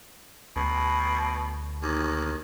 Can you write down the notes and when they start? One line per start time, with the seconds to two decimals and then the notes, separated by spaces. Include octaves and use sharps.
0.56 D2 B2
1.82 D#2